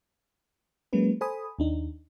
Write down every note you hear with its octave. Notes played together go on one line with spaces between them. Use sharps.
F#3 G#3 A#3 C#4 B4
A4 C5 G#5 B5 D#6
D#2 D4 D#4